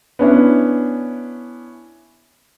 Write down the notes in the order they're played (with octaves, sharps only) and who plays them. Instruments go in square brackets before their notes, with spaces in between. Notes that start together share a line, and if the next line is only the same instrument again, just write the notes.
[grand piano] B3 C#4 D4 E4